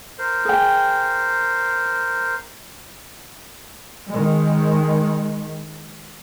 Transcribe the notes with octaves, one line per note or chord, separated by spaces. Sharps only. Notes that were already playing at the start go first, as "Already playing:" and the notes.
A#4 C5
G#4 G5
D#3 G#3